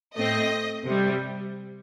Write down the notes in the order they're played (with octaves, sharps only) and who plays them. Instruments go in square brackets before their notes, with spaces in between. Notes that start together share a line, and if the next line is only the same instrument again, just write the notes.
[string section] A2 A3 C4 D#5
C3 G3 C4